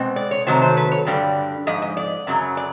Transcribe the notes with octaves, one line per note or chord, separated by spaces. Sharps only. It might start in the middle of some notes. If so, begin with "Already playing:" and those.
Already playing: B2 G#3 C4
D5
C#5
C3 D#3 F#3 A3 C5
C5
B4
C#5
G2 D3 G3 D5
G#2 F3 D#5
D#5
D5
F#2 C#3 F#3
D5